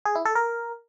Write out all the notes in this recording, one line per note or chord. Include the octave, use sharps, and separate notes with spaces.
G#4
E4
A4
A#4